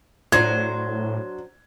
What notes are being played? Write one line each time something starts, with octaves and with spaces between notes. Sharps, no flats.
A2 F#3 D4 C5 G#6